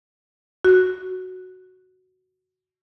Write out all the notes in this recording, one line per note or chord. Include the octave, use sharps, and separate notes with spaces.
F#4 F#6